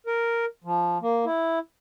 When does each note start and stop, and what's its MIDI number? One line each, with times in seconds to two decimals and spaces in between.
0.07 0.45 70
0.64 0.98 53
1.02 1.25 58
1.25 1.59 64